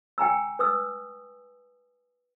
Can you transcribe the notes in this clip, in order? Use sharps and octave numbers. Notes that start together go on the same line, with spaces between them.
G5 G#5 A#5 E6
B4 D#6 E6